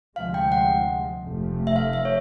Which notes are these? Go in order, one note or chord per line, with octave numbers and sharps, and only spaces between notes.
D2 C3 F3 G#3 F5
G5
F#5
F1 F2 C3 F3 A3
E5
F5
E5
C#5